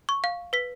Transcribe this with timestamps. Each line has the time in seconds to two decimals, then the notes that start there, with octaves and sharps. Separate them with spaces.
0.09 C#6
0.24 F5
0.53 B4 B6